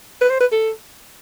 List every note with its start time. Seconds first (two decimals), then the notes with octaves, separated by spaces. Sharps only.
0.21 B4
0.30 C5
0.40 B4
0.52 A4